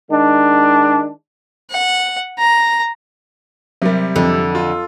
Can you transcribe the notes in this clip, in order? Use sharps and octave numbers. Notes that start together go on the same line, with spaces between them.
D#3 G#3 D4
F#5
A#5
C3 F#3 G3 A#4
F2 D3
F4